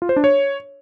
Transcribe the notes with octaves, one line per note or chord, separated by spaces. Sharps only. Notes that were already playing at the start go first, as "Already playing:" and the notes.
F4
C5
D4
C#5